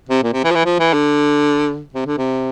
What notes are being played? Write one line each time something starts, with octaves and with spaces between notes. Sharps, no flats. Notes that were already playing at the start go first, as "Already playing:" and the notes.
C3
A#2
C3
E3
F3
E3
F3
E3
D3
C3
D3
C3